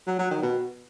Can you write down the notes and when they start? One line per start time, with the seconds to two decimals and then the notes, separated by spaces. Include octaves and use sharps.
0.07 F#3
0.19 F#3
0.31 D#3
0.43 B2